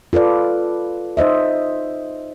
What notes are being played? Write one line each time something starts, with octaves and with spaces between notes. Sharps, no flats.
F4 A4 B4 D5
D#4 C5 D#5 E5